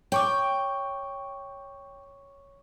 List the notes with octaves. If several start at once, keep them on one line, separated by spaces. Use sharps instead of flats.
C#5 G5 C#6 D6